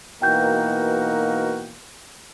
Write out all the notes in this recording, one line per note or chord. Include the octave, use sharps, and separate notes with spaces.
B2 E3 A#3 D#4 F#4 A#4 G5 G6